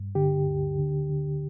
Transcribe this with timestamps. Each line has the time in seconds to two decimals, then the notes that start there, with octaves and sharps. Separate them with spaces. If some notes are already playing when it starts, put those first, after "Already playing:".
Already playing: G2
0.15 D3 G4
0.47 D2
0.78 D3
1.10 D3